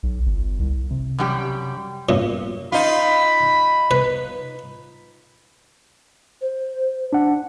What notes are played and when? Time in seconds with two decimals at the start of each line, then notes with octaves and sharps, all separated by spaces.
0.03 B1
0.26 G1
0.59 C2
0.91 C3
1.19 F#2 G3 G4
2.09 F#2 A#2
2.72 D#4 F4 B5
3.91 B4
6.41 C5
7.13 D4 F#5